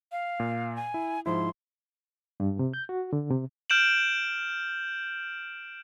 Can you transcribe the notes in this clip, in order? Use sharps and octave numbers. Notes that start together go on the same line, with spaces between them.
F5
A#2
G#5
E4
G#2 F3 E4 C6
G2
C3
G6
F#4
D3
C3
F6 G6 D7 E7 F#7